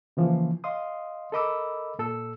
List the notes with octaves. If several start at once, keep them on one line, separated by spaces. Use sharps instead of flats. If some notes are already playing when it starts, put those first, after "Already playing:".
C#3 E3 F3 A#3
D#5 F5 C6 D#6
A4 A#4 D#5 B5 D6 E6
A#2 A4 E6